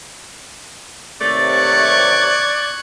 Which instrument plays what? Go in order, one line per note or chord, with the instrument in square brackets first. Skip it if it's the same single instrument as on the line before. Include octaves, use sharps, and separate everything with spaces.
[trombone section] D#2 C3 [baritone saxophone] A3 [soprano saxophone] D5
[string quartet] C#6 F#6 G#6